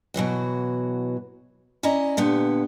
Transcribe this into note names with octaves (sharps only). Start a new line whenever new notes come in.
B2 E3 F#3 F#4
C#4 E4 D5 D#5 A#5
A#2 D3 B3 G4